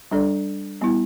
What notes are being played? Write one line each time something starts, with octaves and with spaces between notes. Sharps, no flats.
G3 D4 A4 D5
G3 B3 E4